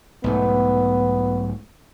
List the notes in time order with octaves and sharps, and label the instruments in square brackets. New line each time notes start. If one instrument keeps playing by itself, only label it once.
[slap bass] B1 G#2 A3 [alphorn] B3